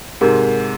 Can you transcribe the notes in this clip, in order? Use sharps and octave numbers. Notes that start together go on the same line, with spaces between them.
G#2 C3 A#4